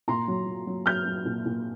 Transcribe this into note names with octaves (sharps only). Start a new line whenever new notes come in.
A#2 A#5 C6
F#3
F#3
F#3
F#3 F6 G6
F#3
A#2
A#2